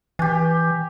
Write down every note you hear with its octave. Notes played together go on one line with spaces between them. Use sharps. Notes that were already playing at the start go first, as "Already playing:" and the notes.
E3 G4 G#5